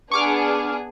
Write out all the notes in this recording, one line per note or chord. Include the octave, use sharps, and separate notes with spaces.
B3 D4 G#4 C#6 D6 F6